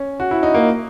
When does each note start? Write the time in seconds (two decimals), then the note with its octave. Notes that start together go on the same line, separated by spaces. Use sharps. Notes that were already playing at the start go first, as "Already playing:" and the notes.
Already playing: C#4
0.20 F#4
0.31 E4
0.43 D#4
0.54 A#3